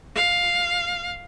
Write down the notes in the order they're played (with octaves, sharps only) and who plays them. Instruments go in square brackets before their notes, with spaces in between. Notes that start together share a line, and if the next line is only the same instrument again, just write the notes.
[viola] F5